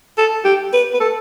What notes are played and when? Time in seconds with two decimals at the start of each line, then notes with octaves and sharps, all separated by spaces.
0.18 A4
0.45 G4
0.73 B4
0.94 B4
1.01 A4